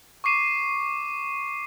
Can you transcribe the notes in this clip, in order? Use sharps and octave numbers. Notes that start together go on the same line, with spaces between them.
C#6 D6 C7 D#7 E7